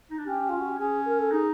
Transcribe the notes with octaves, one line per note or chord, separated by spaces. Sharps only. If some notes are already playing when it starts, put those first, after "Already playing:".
D#4
D4
C#4 G4
F4
F#4
G4
C#4 G#4
A#4
A4
D#4 G#4